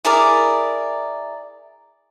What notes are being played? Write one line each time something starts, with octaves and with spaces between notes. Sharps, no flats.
E4 G#4 A#4 D5